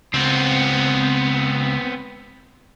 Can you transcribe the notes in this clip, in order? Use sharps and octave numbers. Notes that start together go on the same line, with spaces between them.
C#2 B3 C4